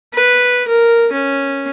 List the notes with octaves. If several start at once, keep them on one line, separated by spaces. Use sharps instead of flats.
B4
A#4
C#4